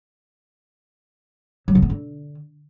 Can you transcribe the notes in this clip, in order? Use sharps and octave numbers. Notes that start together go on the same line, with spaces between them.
F#3
C#3
B3
D3